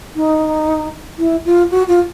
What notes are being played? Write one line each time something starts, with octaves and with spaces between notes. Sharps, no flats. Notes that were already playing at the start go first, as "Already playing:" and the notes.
D#4
E4
F4
F#4
F4